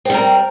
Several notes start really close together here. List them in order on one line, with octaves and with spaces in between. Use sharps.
C4 G3 A#4